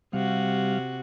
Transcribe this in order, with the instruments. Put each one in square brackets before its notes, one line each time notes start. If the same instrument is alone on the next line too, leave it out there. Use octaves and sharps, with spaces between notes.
[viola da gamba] C3 F#4 [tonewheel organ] G3 F5